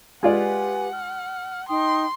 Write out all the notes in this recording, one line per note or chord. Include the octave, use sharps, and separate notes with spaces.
G#3 F4 G4 B4 D5 F#5 G#5
F6
D#4 G5 C6 D#6